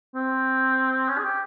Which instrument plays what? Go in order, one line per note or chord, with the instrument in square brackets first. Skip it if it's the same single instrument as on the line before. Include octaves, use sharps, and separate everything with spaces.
[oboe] C4
C#4
G#4
G4